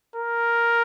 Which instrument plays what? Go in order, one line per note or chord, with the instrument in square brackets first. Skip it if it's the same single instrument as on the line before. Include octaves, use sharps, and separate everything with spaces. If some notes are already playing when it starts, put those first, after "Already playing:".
[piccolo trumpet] A#4